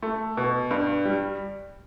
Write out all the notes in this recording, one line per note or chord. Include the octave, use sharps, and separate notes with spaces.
A3
B2
G2
G3